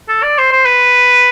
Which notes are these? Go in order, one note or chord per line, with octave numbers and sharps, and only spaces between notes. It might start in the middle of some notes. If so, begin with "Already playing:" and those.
A4
D5
C5
C5
B4